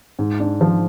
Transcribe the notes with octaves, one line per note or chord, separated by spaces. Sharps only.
G#2
D4
F3